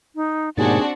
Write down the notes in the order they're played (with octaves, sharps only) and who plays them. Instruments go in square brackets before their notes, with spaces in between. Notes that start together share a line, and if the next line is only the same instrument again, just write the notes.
[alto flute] D#4
[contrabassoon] D#2 [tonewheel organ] G#2 B2 A6 [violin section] C4 D4 F#4 [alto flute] G#4